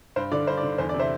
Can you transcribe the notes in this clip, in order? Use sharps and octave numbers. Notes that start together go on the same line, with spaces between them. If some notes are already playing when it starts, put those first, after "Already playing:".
G2 C5
D3 D5
G2 C5
D5
D3
E2 C5
D5
C3
C5 E5